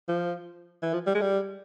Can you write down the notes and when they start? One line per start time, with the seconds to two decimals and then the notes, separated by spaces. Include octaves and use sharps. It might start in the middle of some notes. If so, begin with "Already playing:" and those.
0.08 F3
0.82 E3
0.93 F3
1.07 G3
1.15 G#3
1.21 G3